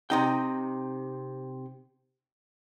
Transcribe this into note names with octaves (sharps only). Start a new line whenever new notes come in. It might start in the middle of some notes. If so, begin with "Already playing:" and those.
C3 D#4 G5